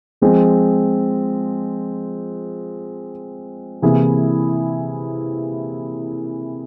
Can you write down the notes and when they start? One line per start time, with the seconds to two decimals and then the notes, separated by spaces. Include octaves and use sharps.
0.22 F3 G#3 C4
3.82 C3 E3 A#3 E4 G#4